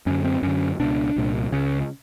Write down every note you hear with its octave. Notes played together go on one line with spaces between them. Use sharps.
F#2 D3 C#4
C4
F#2 D3 C#4
C#2 B2 D4
C2 A#2
C#2 C#3 C#4